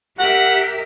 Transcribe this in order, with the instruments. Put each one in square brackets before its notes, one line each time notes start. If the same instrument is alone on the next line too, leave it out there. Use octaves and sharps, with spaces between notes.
[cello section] G4 A#4 E5 [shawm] F#5